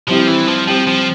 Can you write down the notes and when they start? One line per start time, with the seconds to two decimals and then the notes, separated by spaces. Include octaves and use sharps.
0.07 F3 G3 C4 E4 G4
0.28 E3
0.48 F3
0.68 F3 G3 C4 G4
0.87 F3